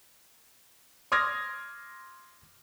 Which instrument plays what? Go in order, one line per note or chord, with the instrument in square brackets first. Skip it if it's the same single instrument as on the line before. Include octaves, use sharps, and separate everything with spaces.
[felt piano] C6 D6 D#6 F6 G#6 A#6